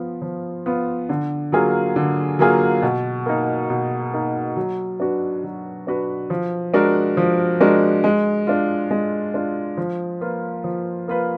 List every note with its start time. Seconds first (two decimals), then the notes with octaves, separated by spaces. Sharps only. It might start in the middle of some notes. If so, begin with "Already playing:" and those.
Already playing: F3 B3 F4
0.22 F3
0.66 B3 F4
1.09 D3
1.52 F#3 A#3 F4 G#4
1.96 D3
2.39 F#3 A#3 F4 G#4
2.82 B2
3.26 A#3 D#4
3.70 B2
4.13 A#3 D#4
4.57 F#3
5.00 D4 F#4 B4
5.44 F#3
5.87 D4 F#4 B4
6.30 F3
6.74 G#3 D4 F#4 A#4
7.17 F3
7.60 G#3 D4 F#4 A#4
8.04 G#3
8.47 D4 F4
8.91 G#3
9.34 D4 F4
9.77 F3
10.21 A#3 F4 B4
10.64 F3
11.08 A#3 F4 B4